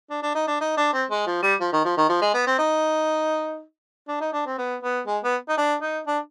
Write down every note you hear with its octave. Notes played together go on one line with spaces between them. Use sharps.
D4
D4
D#4
D4
D#4
D4
C4
G#3
F3
G3
F3
D#3
F3
D#3
F3
G#3
B3
C4
D#4
D4
D#4
D4
C4
B3
B3
G#3
B3
D#4
D4
D#4
D4